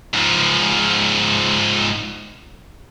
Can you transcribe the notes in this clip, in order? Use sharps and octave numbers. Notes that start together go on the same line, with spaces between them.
G#2 F3